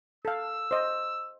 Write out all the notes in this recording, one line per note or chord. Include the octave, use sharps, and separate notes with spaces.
A4 F5 E6
C5 D#5